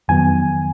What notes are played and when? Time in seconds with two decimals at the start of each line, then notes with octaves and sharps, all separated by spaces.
0.08 F2 D#3 F#3 B3 G#5